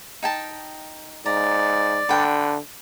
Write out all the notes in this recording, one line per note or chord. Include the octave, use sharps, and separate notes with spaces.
D#4 G5 A5
G#2 D5 A#5
D3 B4 F#5 G5